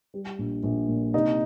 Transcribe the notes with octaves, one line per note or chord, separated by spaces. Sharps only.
G3
A#1
A#1
A#2
C3 D#4